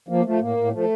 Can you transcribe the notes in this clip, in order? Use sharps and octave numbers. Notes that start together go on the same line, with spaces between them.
F3 A#3
F3 A3
A2 A#3
A2
F3 A3